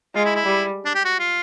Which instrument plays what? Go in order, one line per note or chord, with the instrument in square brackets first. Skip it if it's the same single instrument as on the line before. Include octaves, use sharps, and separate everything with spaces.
[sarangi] G#3 [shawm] F4
[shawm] E4
E4
[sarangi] G3
[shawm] D4
G4
F#4
F4